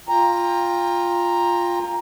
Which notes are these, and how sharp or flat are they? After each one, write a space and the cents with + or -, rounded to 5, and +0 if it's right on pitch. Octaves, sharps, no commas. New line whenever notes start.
F4 +0 G5 +25 A#5 +0